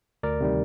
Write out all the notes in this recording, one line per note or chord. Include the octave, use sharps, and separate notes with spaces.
D2 A#4 D5
C3 D#3 G3